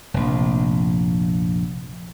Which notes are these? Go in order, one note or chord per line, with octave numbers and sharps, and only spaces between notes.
F1 A#1